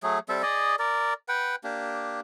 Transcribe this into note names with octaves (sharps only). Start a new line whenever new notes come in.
F#3 A3 G#4
G3 C4 A4 E5
G#4 D5 D#5
A#4 D5
B4 F#5 G5
A#3 D4 G4